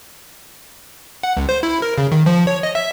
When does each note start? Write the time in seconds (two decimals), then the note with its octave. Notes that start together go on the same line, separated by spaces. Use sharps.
1.23 F#5
1.37 C#2
1.49 C5
1.63 E4
1.82 A#4
1.98 C#3
2.12 D#3
2.26 F3
2.47 C#5
2.63 D#5
2.75 E5